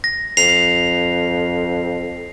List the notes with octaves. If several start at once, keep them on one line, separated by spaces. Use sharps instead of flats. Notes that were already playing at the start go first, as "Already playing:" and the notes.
A#6
F2 C7 F7